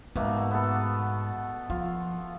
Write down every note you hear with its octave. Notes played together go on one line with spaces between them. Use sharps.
G#2 B2 A3 A#3
B3 A4
F3 F4